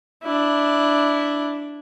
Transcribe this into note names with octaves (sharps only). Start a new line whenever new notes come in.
D4 E4